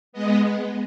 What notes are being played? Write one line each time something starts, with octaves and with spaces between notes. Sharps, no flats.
G#3 B3 D#5